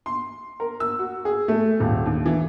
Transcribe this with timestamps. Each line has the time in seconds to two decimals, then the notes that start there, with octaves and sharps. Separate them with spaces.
0.06 C6
0.60 A#4
0.80 E6
0.99 F#4
1.25 G#4
1.48 A3
1.80 D#1
2.06 D#2
2.26 E3